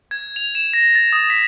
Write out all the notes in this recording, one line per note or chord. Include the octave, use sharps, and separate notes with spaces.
G#6
F7
E7
A#6
A6
D#6
B6